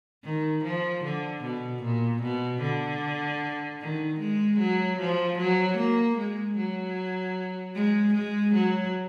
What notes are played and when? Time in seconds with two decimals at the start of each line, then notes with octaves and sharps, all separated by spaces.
0.25 D#3
0.64 F3
1.04 D3
1.43 B2
1.83 A#2
2.22 B2
2.62 D3
3.81 D#3
4.20 G#3
4.59 F#3
4.99 F3
5.38 F#3
5.77 A#3
6.18 G#3
6.57 F#3
7.75 G#3
8.14 G#3
8.54 F#3